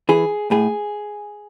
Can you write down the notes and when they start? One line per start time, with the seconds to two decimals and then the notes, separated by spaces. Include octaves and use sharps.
0.09 E3 G#4
0.51 A2 G#4